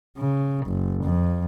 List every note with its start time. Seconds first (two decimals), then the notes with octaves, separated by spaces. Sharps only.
0.18 C#3
0.66 F#1
1.04 F2